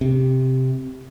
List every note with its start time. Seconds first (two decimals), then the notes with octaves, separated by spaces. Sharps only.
0.01 C3